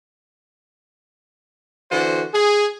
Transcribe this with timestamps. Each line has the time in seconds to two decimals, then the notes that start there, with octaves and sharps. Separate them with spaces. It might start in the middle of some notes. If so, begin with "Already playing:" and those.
1.92 D3 E3 F#4 C5
2.34 G#4